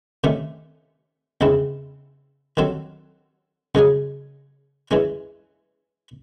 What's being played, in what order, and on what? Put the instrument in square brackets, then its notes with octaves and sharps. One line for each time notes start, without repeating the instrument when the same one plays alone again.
[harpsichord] C3 D#3 A3 C#4
E2 C#3 G#3 C4 E4
D#3 F#3 C4 F#4 A4
F#2 C#3 G#3 C#4 G#4
E3 G#3 C#4